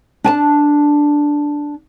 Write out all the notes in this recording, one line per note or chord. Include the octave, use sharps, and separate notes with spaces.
D4 G#5 A5